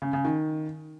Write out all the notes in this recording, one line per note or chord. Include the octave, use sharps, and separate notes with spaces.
C#3
C#3
D#3